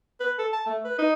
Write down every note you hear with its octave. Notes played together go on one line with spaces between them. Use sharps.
B4
A4
A5
A3
B4
D#4